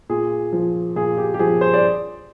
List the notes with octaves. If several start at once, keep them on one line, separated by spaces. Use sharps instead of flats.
A#2 G#4
F3
A#2 G#4
G4
G4
F3 G#4
C5
D5